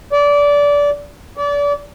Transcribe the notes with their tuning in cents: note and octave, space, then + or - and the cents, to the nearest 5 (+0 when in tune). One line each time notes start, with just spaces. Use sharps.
D5 -20
D5 -30